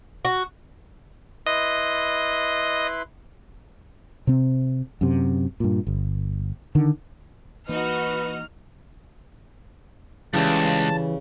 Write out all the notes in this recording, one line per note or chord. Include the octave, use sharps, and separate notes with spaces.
F#4
E4 B4 D#5 C6
C3 C4
F#2 C3
G2 A#2
G1
D3 D#3
E3 A#3 D#4 F#4 B4 F6
C#2 F#2 C#3 E3 G3 A5